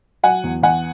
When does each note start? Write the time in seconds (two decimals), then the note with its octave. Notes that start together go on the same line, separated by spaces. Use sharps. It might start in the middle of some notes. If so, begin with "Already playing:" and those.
0.23 F#3 F#5 G#5
0.44 E2
0.63 E2 F#5 G#5